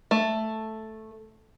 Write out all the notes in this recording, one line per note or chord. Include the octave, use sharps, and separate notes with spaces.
A3